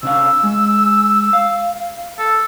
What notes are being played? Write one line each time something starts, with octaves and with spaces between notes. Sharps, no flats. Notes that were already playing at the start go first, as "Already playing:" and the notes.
C3 D4 F5 E6
G#3
F5
A4